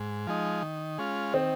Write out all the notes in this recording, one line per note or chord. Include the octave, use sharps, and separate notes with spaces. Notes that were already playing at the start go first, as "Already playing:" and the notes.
Already playing: G#2
F3 G#3 D#4
D#3
G#3 C#4 F4
D#3 C4